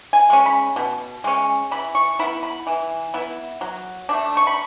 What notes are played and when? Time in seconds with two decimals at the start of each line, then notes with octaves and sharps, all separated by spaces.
0.13 G#5
0.30 G#3 C#4
0.46 B5
0.76 B2
1.24 G#3 C#4
1.71 E3 B5
1.95 C#6
2.19 B3 E4 B5
2.43 B5
2.67 E3
3.14 B3 E4
3.61 F#3
4.09 A3 D4
4.37 C#6
4.47 B5